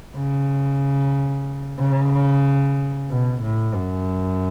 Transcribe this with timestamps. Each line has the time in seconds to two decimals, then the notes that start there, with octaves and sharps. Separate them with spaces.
0.16 C#3
1.79 C#3
3.10 B2
3.43 A2
3.75 F#2